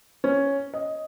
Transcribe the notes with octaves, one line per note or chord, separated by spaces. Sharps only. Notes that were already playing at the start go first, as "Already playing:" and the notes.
C#4
D#5